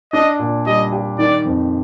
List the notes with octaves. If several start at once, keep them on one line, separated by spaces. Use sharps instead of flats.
D4 D#5
A#2
G3 D#5
G4
D#3 D5
F2